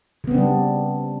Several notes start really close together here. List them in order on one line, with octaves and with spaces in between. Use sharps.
C#3 B3 C4 D4 G3